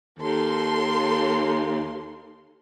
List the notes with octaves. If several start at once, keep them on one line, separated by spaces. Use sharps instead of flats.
D#2 A4 C6